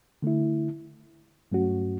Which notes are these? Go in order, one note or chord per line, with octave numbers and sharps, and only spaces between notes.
D3 A3 E4
G2 F#3 A3 C#4 F#4